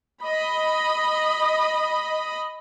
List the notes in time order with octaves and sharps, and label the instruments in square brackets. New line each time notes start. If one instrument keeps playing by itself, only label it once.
[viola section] D#5 B5